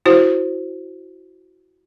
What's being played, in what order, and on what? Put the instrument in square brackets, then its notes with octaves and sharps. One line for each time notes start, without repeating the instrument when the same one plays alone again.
[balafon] E4 F#4 C5